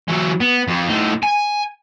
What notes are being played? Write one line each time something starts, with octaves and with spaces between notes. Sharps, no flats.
E3 F#3
B3
F2
A2 D#4
G#5